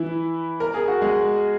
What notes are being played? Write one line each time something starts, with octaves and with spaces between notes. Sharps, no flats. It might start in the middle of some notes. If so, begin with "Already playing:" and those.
Already playing: E3 E4
A#4
G#4
F#4
G#3 G#4